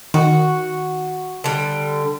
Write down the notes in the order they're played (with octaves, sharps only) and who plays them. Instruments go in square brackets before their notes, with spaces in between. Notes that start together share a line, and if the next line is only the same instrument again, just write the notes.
[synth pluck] D#3 [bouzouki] F#4
[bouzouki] D3 G3